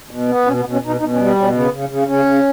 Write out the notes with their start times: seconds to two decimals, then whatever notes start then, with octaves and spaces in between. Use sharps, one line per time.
0.11 B2
0.29 B3
0.46 B2 C#4
0.60 B3
0.65 B2
0.73 C#4
0.82 B2
0.87 D#4
1.00 B2 D#4
1.13 C#4
1.18 G3
1.27 B3
1.36 B2 C#4
1.53 C#3 B3
1.71 C#3
1.89 C#3
2.07 C#3 C#4
2.25 C#3